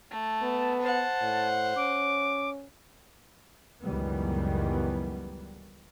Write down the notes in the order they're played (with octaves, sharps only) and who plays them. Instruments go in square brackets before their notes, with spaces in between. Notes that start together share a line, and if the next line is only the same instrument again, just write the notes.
[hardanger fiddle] A3
[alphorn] B3 [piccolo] A5
[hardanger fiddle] C5 F#5 [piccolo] A5
[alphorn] A2
[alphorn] C#4 [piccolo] D6
[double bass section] C#2 F#2 D#3 E3 G3 B3